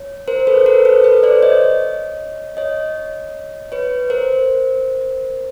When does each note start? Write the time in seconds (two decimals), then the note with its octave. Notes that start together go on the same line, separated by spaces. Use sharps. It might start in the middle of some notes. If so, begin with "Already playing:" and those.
Already playing: C#5
0.28 A#4 C5
0.47 A4 B4
0.66 A#4 C5
0.85 A4 B4
1.04 A4 B4
1.23 C5 D5
1.43 C#5 D#5
2.57 C#5 D#5
3.72 B4 C#5
4.10 A#4 C5